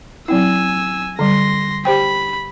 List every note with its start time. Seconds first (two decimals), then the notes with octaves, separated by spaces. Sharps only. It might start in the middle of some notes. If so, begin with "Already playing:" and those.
0.28 F#3 C4 E4 G#5 E6
1.19 D3 G3 C6 A#6
1.85 G4 C5 G5 B5